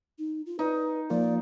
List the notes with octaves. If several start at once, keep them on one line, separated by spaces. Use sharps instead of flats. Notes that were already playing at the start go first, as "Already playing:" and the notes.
D#4
F4
D#4 B4
F3 A#3 F4 D5